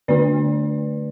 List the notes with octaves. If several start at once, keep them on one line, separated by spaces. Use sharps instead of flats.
D3 A3 D4 B4 D5